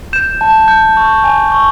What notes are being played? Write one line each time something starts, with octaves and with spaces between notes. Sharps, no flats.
G6 E7
A5
G6
C#6
G#5
C#6